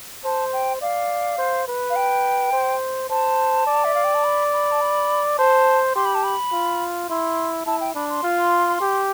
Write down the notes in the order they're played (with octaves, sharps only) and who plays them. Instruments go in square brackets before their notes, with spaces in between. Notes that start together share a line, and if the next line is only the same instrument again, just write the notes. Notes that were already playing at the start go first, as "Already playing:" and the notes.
[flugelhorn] C5 [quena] A5
[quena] G5
[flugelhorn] D5 [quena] F5
[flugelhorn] C5
B4
[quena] F5
G5
[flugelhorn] C5
[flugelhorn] C5 [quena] A5
[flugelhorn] D5
[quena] E5
F5
G5
A5
B5
B5
A5
B5
[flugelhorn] C5 [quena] A5
[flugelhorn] G4 [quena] C6
[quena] B5
A5
B5
[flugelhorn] F4
[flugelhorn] E4 [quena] C6
[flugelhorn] E4 [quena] A5
[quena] G5
[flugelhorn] D4 [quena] B5
[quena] C6
[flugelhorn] F4
G4